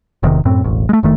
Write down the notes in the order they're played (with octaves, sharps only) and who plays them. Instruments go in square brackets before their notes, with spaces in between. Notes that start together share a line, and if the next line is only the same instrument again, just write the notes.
[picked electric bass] E1 E2 C3 D#3
F#2 A2 C4
E1 A1
G#3 A3
F#1 D#3 A3